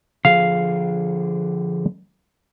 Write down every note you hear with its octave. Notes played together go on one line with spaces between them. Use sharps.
D3 F3 G#4 F5